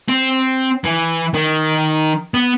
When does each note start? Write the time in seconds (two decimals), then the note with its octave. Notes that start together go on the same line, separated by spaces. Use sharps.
0.09 C4
0.85 E3
1.34 D#3
2.34 B3